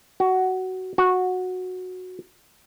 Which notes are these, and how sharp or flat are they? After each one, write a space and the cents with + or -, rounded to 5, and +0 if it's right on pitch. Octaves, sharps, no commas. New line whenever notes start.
F#4 +15
F#4 -10